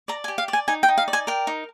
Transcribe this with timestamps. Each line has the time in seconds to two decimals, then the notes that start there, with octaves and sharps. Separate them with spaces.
0.08 D5 A#5
0.24 G#5
0.28 G4
0.38 F5
0.48 D5
0.53 G#5
0.68 D#4 G#5
0.83 G5
0.88 D#4
0.98 F5
1.08 D5
1.13 G#5
1.27 A#4 G5
1.47 D#4